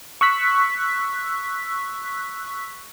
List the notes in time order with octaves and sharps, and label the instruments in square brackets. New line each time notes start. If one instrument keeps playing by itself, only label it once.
[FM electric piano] C#6 E6 F#6 B6